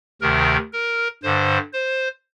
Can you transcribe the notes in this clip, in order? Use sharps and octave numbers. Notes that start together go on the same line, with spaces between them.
D2 C3 D#3 A#4
A#4
G2 D3 C5
C5